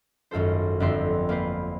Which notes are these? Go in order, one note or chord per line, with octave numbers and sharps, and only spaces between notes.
G#1 F#2 F4 A4 C5
G1 F2 C4 E5 C6
A#3 F4 B4 C5